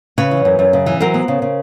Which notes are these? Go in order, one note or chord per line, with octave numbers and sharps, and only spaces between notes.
C#3 B4 C#5
E3
F#2
F#2
C#3
E3
F#3 A#4 C5
B3
C#3
C#3